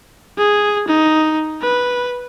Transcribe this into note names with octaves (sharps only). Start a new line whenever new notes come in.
G#4
D#4
B4